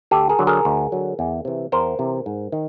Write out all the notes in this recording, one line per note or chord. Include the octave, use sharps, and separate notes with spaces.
D2 G4 A4
G#4 A#4
D3 F#3
G#4 A#4
D2
D3 F#3
E2
C3 E3
E2 A#4 C5
C3 E3
G#2
D#3